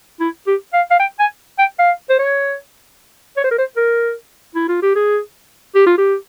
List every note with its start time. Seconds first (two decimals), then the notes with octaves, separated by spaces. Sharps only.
0.20 E4
0.47 G4
0.73 F5
0.91 F5
1.00 G5
1.19 G#5
1.59 G5
1.79 F5
2.09 C5
2.19 C#5
3.37 C#5
3.44 C5
3.51 A#4
3.59 C5
3.77 A#4
4.55 E4
4.69 F4
4.82 G4
4.95 G#4
5.75 G4
5.86 F4
5.98 G4